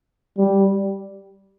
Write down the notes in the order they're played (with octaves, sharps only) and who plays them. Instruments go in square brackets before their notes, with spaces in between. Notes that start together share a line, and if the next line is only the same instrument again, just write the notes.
[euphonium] G3